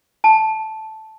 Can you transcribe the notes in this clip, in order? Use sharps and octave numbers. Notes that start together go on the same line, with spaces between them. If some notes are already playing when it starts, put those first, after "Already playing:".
A5